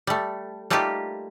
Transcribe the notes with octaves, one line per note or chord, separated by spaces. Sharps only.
G3 A3
G3 A3 A#3 D#4 F4 G4